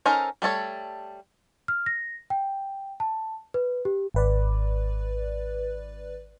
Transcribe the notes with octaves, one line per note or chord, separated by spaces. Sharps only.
C#4 D#4 A4 A#4 C5
G3 A3 A4 C#5
F6
A#6
G5
A5
B4
G4
G#1 B4 D5